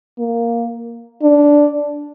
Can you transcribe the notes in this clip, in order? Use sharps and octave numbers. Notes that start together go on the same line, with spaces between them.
A#3
D4